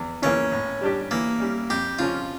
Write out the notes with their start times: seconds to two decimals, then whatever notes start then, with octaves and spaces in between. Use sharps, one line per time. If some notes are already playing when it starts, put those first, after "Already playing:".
Already playing: E2
0.22 C#3 E3 A#3 C#4
0.52 A2
0.81 G3 D4 G4
1.11 E3 A#3
1.40 G3 C#4
1.69 F2 G4
1.99 C#3 F3 C#4 F4